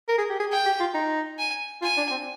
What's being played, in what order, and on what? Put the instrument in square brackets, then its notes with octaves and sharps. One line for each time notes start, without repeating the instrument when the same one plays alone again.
[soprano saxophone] A#4
G#4
G4
G#4
[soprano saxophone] G#4 [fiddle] G5
[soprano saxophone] G4
F4
D#4
[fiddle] G#5
[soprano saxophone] F4 [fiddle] G#5
[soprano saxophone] D4
C4